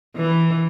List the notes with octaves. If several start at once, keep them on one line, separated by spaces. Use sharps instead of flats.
E3